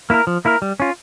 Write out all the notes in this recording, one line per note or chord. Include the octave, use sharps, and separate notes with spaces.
A#3 E4 A#4
F3
A#3 E4 A#4
G3
C#4 F4